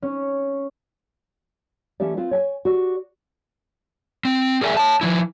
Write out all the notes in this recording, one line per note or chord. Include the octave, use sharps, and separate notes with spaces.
C#4
E3 A3 C#4 G4 D5
C4 F4 B4
C#5 G5 G#5
F#4 G4 D5
C4
G#4 A#4 C#5 E5 G#5
C#5 A5
F3 G#3 E4